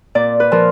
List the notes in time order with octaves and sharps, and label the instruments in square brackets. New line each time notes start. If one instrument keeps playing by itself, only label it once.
[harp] A#2 D5
B4
F3 A#4